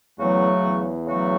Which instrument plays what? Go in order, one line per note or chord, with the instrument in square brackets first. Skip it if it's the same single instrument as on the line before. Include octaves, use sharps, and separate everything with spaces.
[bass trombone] E2 [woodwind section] C#3 F#3 A3 F#4
[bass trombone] E2
[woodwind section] C#3 F#3 A3 F#4